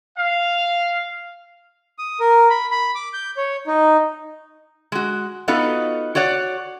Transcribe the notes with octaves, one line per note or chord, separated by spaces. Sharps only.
F5
D#6
A#4
B5
B5
D6
G6
C#5
D#4
G#3 F#4
B3 D#4 F4 F#4 A4 D#5
F#4 C#5 D5 F#5